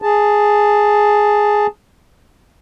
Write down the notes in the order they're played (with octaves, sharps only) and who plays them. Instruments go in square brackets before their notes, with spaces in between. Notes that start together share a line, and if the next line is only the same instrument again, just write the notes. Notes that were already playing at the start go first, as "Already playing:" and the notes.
[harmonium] G#4 A5